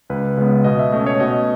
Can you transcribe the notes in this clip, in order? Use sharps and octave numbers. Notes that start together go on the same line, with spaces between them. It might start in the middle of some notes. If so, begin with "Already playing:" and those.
C#2 B4
C#3 G#3 B3
B2 D#5
E5
A3 C#4 D#5
C#5
B2 D#5